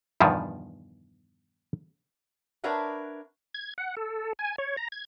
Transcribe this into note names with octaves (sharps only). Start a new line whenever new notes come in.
E2 G2 B2 D#3 F3
D4 A#4 B4 C#5 E5 F#5
G#6
F#5
A4
G#5
C#5
A#5
G#6